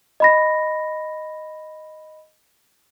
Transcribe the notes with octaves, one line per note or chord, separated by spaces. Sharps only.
D#5 B5 A#6